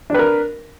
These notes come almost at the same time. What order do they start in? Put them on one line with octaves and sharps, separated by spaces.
D4 B4 A#4